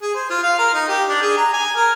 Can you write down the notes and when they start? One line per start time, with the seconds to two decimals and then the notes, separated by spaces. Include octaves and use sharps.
0.02 G#4
0.14 C5
0.30 F4
0.43 F5
0.59 A#4
0.74 D#4
0.89 G4
1.09 D4
1.22 G#4
1.37 A#5
1.53 G#5
1.75 A#4